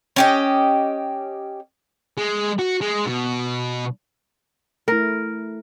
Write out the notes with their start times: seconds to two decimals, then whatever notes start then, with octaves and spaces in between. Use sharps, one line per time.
0.16 C#4 G4 D#5
2.18 G#3
2.59 F#4
2.81 G#3
3.06 B2
4.88 A3 E4 A#4